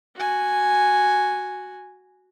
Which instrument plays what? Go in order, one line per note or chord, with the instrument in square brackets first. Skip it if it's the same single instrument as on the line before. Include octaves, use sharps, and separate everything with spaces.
[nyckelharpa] F#4 G#5